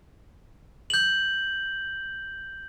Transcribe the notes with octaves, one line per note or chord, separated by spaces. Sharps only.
G6 F#7